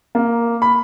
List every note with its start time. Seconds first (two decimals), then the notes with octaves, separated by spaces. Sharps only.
0.15 A#3
0.62 B5